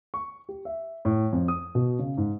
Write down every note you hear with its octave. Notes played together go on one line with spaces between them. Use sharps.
C#6
G4
E5
A2
F2
D#6
B2
C#3
G#2